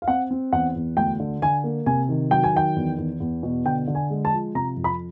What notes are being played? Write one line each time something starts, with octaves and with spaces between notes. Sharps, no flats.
F5
C4 F#5
C4
E2 F#5
E2
D2 G5
D3
D3 G#5
A#3
C3 G#5
D#3
F#3 G5
G#5
D#3 G5
E2
E2
E2
B2
D3 G5
D3
G#5
G#3
A5
F3
C3 A#5
F2
B5